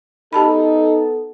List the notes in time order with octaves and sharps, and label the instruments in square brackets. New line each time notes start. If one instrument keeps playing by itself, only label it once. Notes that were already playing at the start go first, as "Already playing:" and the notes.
[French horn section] B3 A4 [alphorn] D#4 [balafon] G4 A5 B5